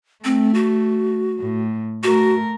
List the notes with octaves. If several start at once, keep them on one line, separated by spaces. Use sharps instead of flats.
A3 C4
F#4
A2
A3 F#4 A#4